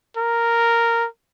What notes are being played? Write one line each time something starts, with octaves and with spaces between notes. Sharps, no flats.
A#4